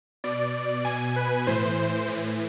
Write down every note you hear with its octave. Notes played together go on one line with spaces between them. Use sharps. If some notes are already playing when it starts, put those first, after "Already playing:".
B2 D5
B2 G#5
B4
A2 E3 C5
A2 E3